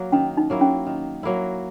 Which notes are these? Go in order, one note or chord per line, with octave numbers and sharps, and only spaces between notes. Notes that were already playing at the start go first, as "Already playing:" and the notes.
Already playing: F#3 A#3
D#3 C#4
D#4
F#3 A#3 E4
C#4
D#3
F#3 A#3 E4